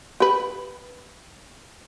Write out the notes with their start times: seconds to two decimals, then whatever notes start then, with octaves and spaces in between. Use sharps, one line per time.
0.20 G4 B4